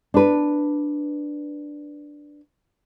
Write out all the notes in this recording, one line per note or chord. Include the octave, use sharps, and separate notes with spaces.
D4 B4